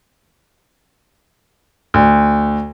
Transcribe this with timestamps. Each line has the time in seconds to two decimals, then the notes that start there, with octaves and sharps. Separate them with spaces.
1.94 D2